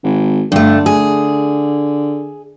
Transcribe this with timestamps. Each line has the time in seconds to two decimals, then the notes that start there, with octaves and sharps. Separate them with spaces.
0.04 G#1
0.52 G2 D3 A3
0.86 G#4